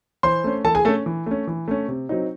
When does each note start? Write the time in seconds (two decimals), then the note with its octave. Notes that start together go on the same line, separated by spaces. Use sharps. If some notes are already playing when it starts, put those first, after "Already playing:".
0.23 E3 C5 C6
0.44 A3 C#4
0.64 E3 A4 A5
0.75 G#4 G#5
0.85 A3 A4
0.88 C#4
1.06 E3
1.26 A3 C#4
1.47 E3
1.68 A3 C#4
1.88 C3
2.09 F#3 C4 D#4